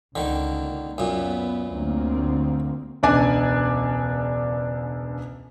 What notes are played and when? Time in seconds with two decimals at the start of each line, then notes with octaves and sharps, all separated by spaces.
0.16 C#2 D3 D#3 A#3
0.98 F#2 A#2 B3
1.69 D2 A#3 C4
3.03 E1 C#2 D4 D5 G#5